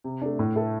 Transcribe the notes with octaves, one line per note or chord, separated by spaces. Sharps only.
C3
A3 D4
A2
A3 E4 A4